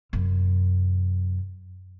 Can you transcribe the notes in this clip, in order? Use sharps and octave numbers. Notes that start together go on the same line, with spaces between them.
F#2 C3